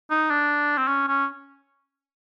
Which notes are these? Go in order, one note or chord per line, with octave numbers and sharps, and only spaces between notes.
D#4
D4
C4
C#4
C#4